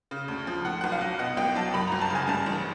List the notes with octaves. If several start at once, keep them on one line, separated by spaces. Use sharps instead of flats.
C#3
D2
F3
A2 F#5
B1 F#5
F5
F#3
B2 F#5
C2 G5
F#3 A5
F#2 B5
A#5
G1
A5
C#3 G#5
G2 A5
A1